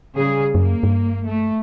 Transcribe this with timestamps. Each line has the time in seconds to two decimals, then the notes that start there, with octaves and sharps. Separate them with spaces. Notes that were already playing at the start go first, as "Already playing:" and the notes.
0.18 C#3 G3 G#4
0.55 F#2 A#3
0.83 G2
1.27 A3